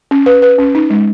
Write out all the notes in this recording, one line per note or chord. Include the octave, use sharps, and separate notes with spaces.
C#4
B4
B4
C#4
D#4
G#3